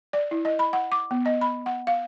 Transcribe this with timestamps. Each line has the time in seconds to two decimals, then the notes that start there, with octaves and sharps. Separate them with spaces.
0.13 D5
0.31 E4
0.45 D#5
0.59 B5
0.73 F#5
0.92 D6
1.11 B3
1.26 D#5
1.41 B5
1.66 F#5
1.87 F5